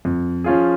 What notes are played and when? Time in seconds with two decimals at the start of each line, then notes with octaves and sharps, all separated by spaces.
0.05 F2
0.44 F3 C#4 F4 G#4